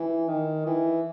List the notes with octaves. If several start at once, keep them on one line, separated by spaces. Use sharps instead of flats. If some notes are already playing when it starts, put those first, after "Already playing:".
Already playing: E3
D#3
E3